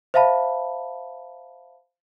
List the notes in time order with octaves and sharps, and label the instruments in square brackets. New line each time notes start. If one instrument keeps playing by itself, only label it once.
[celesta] C5 E5 F5 A5 B5